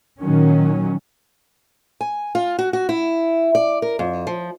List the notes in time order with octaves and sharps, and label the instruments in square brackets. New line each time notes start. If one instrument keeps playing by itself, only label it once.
[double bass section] A#2 D#3 F#3 C#4
[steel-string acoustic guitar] G#5
F4
F#4
F#4
E4
D5
A#4
F2
F3